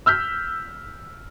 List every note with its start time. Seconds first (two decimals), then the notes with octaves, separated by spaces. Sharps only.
0.06 E6 F6 G6 B6